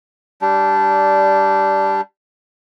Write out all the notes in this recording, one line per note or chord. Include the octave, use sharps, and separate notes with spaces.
G3 D4